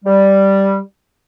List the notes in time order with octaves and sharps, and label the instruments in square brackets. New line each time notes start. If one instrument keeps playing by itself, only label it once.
[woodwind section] G3